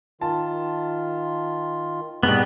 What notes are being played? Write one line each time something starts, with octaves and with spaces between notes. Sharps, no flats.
D#3 F4 A5
G#2 B2 G3 B3